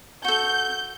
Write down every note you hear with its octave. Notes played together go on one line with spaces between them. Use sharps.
F#4 A4 G6